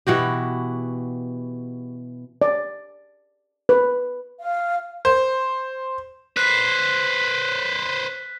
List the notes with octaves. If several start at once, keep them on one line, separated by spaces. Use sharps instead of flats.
B2 E3 F#4 G4
D5
B4
F5
C5
B4 C5 F#6 B6